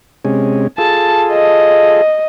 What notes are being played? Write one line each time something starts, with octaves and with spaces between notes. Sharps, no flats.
C3 G#3 C#4
F4 G#4 A4 A5
D#5